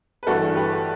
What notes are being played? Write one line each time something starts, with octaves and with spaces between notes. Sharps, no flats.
B4
G1 G2 E3 A3 D4 F#4 A4
G4 B4